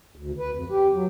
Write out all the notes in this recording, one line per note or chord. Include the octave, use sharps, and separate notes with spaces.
D2
B4
F2
G4
F#3